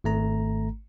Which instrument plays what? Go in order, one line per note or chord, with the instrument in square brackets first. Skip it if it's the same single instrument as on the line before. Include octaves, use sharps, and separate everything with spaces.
[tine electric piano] G#1 A3 A#5